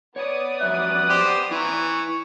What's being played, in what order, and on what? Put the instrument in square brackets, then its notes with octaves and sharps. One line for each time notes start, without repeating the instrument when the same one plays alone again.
[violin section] B3 D5 D#6 [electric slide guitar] C#5
[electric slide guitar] F2 F#3 E5 [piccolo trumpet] F#6
[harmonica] G4 C5
[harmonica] E3 [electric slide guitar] E4 B4 A#5 [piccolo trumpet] C#6